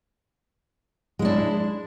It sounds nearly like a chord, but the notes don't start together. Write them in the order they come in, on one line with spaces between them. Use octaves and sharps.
G#3 E4 D4